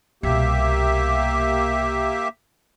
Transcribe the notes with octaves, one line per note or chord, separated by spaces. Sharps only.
C2 B2 A#3 G4 E5